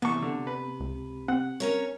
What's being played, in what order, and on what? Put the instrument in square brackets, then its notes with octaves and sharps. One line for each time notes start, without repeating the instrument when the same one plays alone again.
[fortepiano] E2 C#6 [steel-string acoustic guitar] C3 [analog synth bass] B3
[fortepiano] D3
B4
[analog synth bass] C#2
[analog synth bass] C4 [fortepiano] F#5
[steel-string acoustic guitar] C#4 A#4 C#5